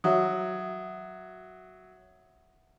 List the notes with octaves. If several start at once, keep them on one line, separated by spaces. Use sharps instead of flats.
F#3 E5 F#5 D#6